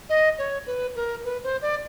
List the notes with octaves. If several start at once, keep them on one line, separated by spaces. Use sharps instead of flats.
D#5
C#5
B4
A#4
B4
C5
D5